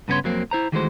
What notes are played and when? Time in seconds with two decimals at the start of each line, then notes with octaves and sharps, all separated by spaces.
0.08 G2 C#3 B3 D4 C#5 C6
0.24 F2 F#3 A#3 C4
0.51 E4 C5 A#5
0.72 D#3 E3 G#3 A3 F#4 C5